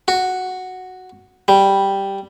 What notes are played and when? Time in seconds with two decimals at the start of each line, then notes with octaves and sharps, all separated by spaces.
0.08 F#4
1.48 G3